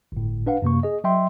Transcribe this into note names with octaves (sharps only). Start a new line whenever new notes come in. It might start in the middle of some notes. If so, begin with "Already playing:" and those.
G1 A2
D4 B4 F5 F#5
F#2 C3 A#3 C#6
G#4 D#5
F#3 D#5 E5 G5 C6